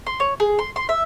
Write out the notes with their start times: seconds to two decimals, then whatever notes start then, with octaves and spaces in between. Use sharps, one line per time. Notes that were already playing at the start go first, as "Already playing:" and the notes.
0.07 C6
0.20 C#5
0.40 G#4
0.59 C6
0.76 C6
0.89 E5